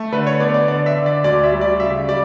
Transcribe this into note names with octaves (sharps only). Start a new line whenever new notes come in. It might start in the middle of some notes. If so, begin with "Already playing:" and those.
Already playing: A3
D3 B4
C#5
B3 D5
D5
D3 D5
E5
D3
D5
D2 D5
E5
G3
D5
C#3 E5
G3 D5